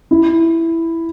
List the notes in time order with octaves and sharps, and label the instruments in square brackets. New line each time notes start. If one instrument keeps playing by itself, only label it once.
[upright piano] E4